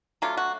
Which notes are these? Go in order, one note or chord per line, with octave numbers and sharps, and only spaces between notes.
F#3 A3 D4 F4
F#4